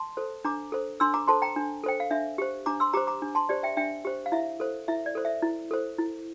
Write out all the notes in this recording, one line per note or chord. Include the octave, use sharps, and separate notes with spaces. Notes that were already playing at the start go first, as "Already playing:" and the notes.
Already playing: A5 C6
A4 C5
D4 A#5 D6
A4 C5
D4 C6 E6
A#5 D6
A4 C5 A5 C6
G5 A#5
D4
A4 C5 G5
F5
D4 E5
G4 C5
D4 A#5 D6
C6 E6
G4 C5 A#5 D6
A#5 D6
D4
A5 C6
G4 C5 D5
E5 G5
D4 E5 G5
G4 C5
F5
E4 E5
A4 C5
E4 E5
D5
A4 C5
E5
E4
A4 C5
E4